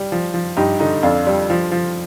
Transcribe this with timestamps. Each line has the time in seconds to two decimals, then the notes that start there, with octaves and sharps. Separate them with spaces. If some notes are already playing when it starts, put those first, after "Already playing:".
Already playing: G3
0.12 F3
0.34 F3
0.57 G2 D#4 G4
0.80 D3 D#4
1.03 F2 D4 F4
1.27 G3
1.50 F3
1.72 F3